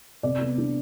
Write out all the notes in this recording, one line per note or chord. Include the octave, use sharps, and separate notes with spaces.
C3 D5
B3
D4